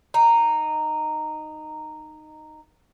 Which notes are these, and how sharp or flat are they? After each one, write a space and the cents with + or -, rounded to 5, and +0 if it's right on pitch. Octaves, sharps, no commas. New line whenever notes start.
D#4 -10